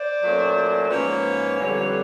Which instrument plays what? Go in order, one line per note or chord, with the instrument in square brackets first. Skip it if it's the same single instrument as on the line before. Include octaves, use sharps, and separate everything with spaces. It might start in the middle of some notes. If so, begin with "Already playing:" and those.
Already playing: [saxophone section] C5 D5
A#2 F#3 A3 C#4
G#2 F3 A#3 C#4 B4 C#5
F2 D3 G3